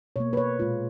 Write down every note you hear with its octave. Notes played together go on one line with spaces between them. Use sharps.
B2 A#3 C#5
B4
C#5
A#2 G#3 F4